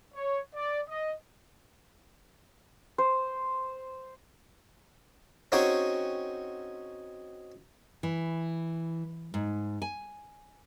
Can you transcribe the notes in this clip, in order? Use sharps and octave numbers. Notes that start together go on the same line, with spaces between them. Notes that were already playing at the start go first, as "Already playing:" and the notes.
C#5
D5
D#5
C5
C4 C#4 D#4 F#4 G#4 G5
E3
G#2
G#5